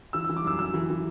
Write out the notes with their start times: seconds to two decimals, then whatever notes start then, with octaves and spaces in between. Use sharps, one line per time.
0.13 E3 E6
0.24 E3 E6
0.37 D6
0.45 F#2 E6
0.59 F#2 E6
0.74 E3
0.90 E3